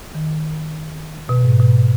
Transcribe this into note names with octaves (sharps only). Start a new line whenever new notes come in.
D#3
B2
G#2
B2